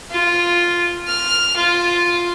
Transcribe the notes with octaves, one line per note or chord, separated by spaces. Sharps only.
F4
F6
F4